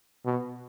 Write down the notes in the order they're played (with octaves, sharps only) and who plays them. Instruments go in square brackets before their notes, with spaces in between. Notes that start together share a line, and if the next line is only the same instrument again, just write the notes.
[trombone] B2